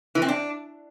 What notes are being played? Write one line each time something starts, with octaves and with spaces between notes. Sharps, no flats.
E3
C4
D4